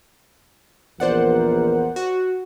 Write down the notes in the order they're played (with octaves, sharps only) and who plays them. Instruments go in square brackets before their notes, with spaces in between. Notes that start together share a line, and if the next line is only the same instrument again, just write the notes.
[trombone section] A#1 E2 A#4 [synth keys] C5 D5 F#5
[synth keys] F#4